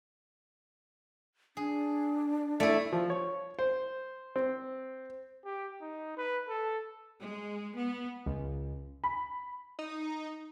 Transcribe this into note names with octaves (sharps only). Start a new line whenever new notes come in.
D4 G#4
A3 E4 A4 D5
F3
C#5
C5
C4
G4
D#4
B4
A4
G#3
B3
C#2
B5
D#4